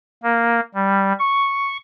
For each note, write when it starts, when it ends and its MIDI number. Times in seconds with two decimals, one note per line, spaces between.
0.23 0.61 58
0.75 1.13 55
1.20 1.77 85